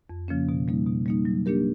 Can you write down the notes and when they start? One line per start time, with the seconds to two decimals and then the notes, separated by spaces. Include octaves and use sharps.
0.10 F2
0.28 C#3 F3 A#3 C#4
0.49 B2
0.68 G3 A#3 D#4
0.87 B2
1.06 G3 A#3 D#4
1.25 F#3
1.46 A#3 D4 G4 A#4